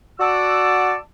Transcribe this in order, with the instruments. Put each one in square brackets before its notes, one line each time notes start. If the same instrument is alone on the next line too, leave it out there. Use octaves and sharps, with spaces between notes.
[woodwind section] F#4 D5 F#5 A5 D6 E6